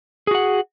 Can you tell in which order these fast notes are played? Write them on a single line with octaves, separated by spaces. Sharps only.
G#4 F#4 F#5